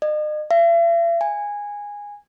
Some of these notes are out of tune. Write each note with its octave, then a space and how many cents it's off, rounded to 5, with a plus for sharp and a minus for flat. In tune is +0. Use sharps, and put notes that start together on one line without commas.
D#5 -40
E5 +45
G#5 -15